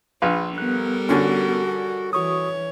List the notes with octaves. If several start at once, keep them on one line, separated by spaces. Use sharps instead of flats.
A#1 D4 F4 B4 C6
G3 B3 A4 A#4 F#6
D3 C#4 F#4
E3 F#4 C#5 C#6 D#6